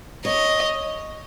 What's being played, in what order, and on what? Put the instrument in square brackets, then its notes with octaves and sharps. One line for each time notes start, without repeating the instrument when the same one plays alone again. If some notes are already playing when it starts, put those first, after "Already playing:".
[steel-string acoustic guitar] C#5 [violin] D#5